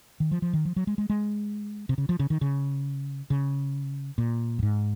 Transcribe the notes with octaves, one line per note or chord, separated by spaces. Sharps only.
D#3
F3
F3
D#3
F3
F#3
G#3
G#3
G#3
C3
C#3
F3
C#3
D#3
C#3
C#3
A#2
F#2
G#2